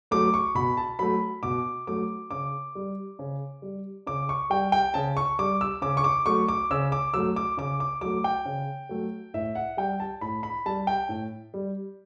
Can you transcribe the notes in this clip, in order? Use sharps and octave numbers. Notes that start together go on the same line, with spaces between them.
F#3 A3 D6
C#6
B2 B5
A5
F#3 A3 B5
B2 D6
F#3 A3 D6
C#3 D6
G3
C#3
G3
C#3 D6
C#6
G3 G5
G5
C#3 A5
C#6
G3 D6
E6
C#3 D6
C#6
D6
F#3 A3 C#6
D6
C#3 E6
D6
F#3 A3 E6
D6
C#3 D6
D6
F#3 A3 D6
G5
C#3
F#3 A3
A2 E5
F#5
G3 G5
A5
A2 B5
B5
G3 A5
G5
A2
G3